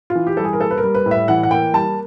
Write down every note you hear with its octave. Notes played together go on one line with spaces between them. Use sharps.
F4
E3
G4
G3 A4
G#4
A#4
A#3 A4
B4
A#4
G3
B4
A2
E5
E3 F#5
F#5
A#3 G5
G3 A5